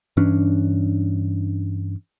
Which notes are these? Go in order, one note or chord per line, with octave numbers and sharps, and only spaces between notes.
G2 E3 C#4 D4